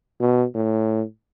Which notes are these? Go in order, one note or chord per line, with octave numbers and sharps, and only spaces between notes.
B2
A2